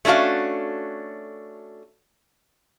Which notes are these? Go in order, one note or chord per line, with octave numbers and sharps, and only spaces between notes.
A3 C#4 D4 F#4 F5